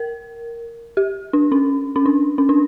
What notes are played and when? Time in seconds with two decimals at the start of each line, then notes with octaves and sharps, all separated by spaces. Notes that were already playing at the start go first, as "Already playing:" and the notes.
Already playing: A#4
0.97 G4
1.33 D4
1.52 C#4
1.96 C#4
2.06 D4
2.38 C#4
2.49 D4